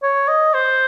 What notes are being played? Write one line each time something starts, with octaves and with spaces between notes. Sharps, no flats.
C#5
D#5
C5